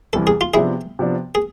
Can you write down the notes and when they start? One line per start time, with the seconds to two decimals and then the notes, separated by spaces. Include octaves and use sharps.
0.13 C2 C3 E3 A4
0.27 G#4
0.41 F4
0.54 C3 F3 B3 D4 E4 G#4
0.99 C3 F3 B3 D4
1.35 G#4